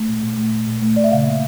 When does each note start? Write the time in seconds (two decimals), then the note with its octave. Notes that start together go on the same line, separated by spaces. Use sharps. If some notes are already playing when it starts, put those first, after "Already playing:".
Already playing: A3
0.08 A#2
0.23 A#2
0.37 A3
0.52 A#2
0.67 A#2
0.82 A3
0.96 A#2 D5
1.04 E5
1.12 C#3 F5
1.27 A#3